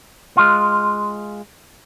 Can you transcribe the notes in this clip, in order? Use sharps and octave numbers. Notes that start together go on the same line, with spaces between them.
G#3 F4